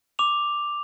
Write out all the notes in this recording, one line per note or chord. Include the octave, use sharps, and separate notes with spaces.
D6 F7